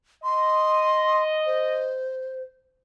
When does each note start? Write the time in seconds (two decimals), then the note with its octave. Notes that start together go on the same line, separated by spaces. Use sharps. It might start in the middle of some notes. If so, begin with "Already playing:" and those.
0.24 D#5 C6
1.46 C5